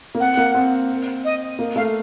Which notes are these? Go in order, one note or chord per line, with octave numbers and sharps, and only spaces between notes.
A#3
C4 F#5
A#3
C4
D#5
A#3
A3 F5